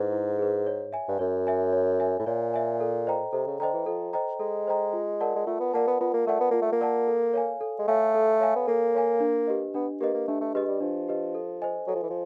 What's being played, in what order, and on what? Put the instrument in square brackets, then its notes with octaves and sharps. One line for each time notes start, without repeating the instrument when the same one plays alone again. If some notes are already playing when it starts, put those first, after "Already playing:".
Already playing: [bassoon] G#2 [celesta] E4 G#4 B4
[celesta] E4
G#4 B4
C#5
E5 G#5
[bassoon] G2
[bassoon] F#2 [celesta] C#5
[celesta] E5 G#5
C#5
E5 G#5
[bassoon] A2
[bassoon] A#2 [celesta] C#5
[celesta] E5 G#5
A4
C5 D#5 G5 A#5
[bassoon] C3 [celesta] A4
[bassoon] C#3
[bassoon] D3 [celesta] C5 D#5 G5 A#5
[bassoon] E3
[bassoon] F3 [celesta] A4
[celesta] C5 D#5 G5 A#5
[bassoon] G#3 [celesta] A4
[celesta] C5 D#5 G5 A#5
F4
A#4 D5 F#5 A5
[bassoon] G#3
[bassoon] A3 [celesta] F4
[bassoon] B3
[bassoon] A#3 [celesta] A#4 D5 F#5 A5
[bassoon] B3
[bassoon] B3 [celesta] F4
[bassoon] A#3
[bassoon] A3 [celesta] A#4 D5 F#5 A5
[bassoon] B3
[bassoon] A#3 [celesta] F4
[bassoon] A3
A#3
[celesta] A#4 D5 F#5 A5
A4
C#5 F5 G#5
A4
[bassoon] G#3
[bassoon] A3 [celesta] C#5 F5 G#5
[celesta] A4
C#5 F5 G#5
[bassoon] B3
[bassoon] A#3 [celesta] A4
[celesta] C#5 F5 G#5
D4
G4 B4 D#5
[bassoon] B3 [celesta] D4
[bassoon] A#3 [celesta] G4 B4 D#5
[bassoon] A#3
[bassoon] A3 [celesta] D4
[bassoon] A3
[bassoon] G#3 [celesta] G4 B4 D#5
[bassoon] G3
[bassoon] F3 [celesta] D4
[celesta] G4 B4 D#5
A4
C5 D#5 G#5
[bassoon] F#3 [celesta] A4
[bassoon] F3
E3
F3